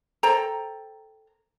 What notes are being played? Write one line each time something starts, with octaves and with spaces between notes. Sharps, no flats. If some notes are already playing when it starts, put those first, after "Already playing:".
A4 C5 G5 A#5